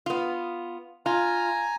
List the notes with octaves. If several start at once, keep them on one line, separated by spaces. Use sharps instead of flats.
B3 F4
F4 G#5 A#5